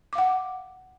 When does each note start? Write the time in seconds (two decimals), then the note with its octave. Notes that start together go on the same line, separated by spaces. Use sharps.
0.13 D6
0.15 F5
0.18 F#5